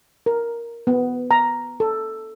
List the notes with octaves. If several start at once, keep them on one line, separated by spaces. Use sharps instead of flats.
A#4
B3
A#5
A4